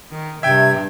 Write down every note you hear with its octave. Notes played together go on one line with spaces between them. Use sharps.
D#3
G2 C3 E5 G5 G#6